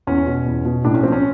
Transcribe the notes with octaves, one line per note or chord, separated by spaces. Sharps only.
E2 C#4
B2
E2
B2
A2 D4
C#4
F3 C4
C#4